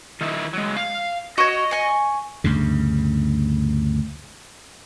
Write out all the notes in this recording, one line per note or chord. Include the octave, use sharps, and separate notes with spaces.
D#3 D#4 E4
F#3 G#3
F5
F#4 C#5 D#5
G#5 C#6
D2 G2 C#3